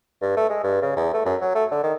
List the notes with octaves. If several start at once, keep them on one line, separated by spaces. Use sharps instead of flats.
G2
A3
G#3
G2
C#3
E2
A3
F#2
F#3
A3
D3
D#3